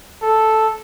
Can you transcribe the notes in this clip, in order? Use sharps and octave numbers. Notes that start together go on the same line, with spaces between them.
A4